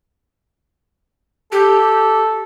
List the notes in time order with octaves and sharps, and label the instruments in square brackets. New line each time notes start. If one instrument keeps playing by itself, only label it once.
[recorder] G4 [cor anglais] A4